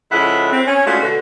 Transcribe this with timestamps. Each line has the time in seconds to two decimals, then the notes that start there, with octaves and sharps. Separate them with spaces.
0.11 C#3 F3 G#3 E4 A4 F#5
0.51 C4
0.66 C#4
0.87 G#3 A3 C#4 D4 F4 F#4
1.00 B2 D3 F#4